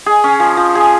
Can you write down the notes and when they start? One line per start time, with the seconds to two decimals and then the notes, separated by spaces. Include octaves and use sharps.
0.06 G#4
0.24 C#4
0.40 F3
0.57 F3
0.75 G#4